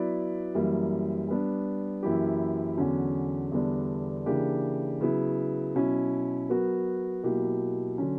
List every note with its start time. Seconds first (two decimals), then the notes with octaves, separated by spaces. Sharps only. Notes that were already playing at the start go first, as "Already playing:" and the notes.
Already playing: F#3 B3 E4 B4 D5
0.55 F#2 E3 G3 A#3
1.29 G3 B3 D4
2.03 F#2 E3 A#3 E4 G4
2.77 E2 D3 F#3 C#4 F#4
3.52 E2 D3 G3 B3 D4
4.26 C#3 E3 A#3 D4 G4
5.01 C#3 F#3 B3 E4
5.75 B2 F#3 C#4 E4
6.49 F#3 B3 F#4 A#4
7.23 B2 F#3 A#3 E4 G4
7.98 D3 F#3 C#4